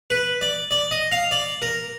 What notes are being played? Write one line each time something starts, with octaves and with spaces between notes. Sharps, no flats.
B4
D5
D5
D#5
F5
D5
A#4